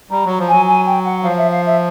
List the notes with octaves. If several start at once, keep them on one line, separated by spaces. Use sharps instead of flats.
G3 A#5
F#3
F3
F#3 G#5
G#5
G5
F#5
F3 F5
E5
F5
E5